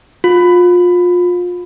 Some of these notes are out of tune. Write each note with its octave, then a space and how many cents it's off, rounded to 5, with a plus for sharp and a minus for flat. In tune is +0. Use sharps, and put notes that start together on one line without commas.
F4 +30